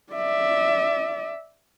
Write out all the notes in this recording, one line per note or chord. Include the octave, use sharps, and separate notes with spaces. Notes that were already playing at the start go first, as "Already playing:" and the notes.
D5 E5